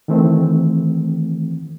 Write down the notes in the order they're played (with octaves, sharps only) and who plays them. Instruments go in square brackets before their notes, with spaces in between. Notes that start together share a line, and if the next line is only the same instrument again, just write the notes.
[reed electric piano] D#3 E3 A3 C4